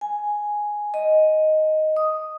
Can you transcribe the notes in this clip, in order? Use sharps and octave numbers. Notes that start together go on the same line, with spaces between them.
G#5
D#5
D#6